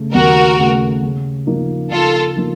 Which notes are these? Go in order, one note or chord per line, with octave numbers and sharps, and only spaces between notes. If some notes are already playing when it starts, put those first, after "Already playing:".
Already playing: C#3 A3
D#2 F#4 A#4
C#3 A3
C#3
F3 A#3 D#4
C#3 F4 A4
F3 A#3 D#4